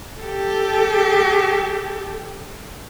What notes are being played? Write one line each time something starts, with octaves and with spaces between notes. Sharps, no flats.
G4 A4